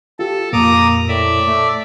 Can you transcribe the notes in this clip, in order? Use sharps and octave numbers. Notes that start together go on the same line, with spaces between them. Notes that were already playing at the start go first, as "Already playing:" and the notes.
F4 G4 A4
F2 A#2 A#3 A#5 D6 D#6
A2 D5 E5
A3